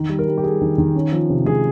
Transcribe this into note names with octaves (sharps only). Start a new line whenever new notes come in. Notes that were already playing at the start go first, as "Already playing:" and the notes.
Already playing: D#3
G3
A#4
G3
G4
G3 G#4
D#3
D#3
C#4
F3
C3
G#3 G#4